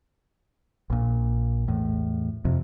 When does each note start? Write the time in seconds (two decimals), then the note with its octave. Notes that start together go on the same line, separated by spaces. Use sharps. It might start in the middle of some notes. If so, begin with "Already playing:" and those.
0.90 A#1 A#2
1.68 E2 A2
2.45 F2 C3